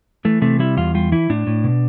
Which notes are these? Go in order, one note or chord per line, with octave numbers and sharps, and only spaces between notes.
E3 A3
C3 A3
G3 E4
E2 F4
G3 F4
E3 E4
A2 D4
A2
B2